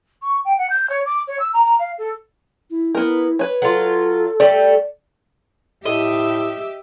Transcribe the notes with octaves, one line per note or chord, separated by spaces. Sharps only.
C#6
G5
F#5
G6
C#5
D6
C#5
E6
A#5
A#5
F5
A4
E4
B3 E4 A#4
B4 C#5
F#3 F4 A4
G3 A3 D5
A2 G4 D#5 E5